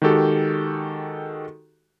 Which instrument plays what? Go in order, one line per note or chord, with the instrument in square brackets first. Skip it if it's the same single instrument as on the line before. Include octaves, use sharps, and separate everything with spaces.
[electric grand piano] D#3 G#3 F#4 G4 A4